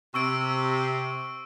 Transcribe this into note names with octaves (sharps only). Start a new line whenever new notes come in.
C3 C#6 E6 D7